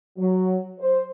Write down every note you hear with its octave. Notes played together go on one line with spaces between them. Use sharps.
F#3
C5